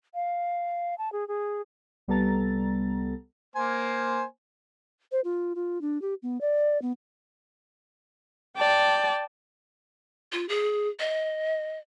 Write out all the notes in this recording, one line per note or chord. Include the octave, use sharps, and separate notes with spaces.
F5
A5
G#4
G#4
C2 G3 B3 A4 A#5 A6
A#3 C5 G#5
C5
F4
F4
D4
G4
B3
D5
B3
D5 G5 A5
F4
G#4
D#5